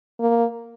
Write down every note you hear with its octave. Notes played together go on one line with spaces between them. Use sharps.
A#3